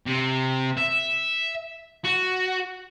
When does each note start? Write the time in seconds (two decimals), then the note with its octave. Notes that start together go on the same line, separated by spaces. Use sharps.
0.06 C3
0.77 E5
2.04 F#4